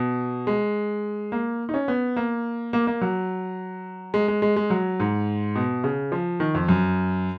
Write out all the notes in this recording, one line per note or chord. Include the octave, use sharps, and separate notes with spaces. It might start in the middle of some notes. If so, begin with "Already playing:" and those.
Already playing: B2
G#3
A#3
D#4
C#4
B3
A#3
A#3
A#3
F#3
G#3
G#3
G#3
G#3
F#3
G#2
B2
C#3
F3
D#3
F2
F#2